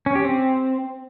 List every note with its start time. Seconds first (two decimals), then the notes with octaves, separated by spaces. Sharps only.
0.06 C#4
0.15 G4
0.24 C4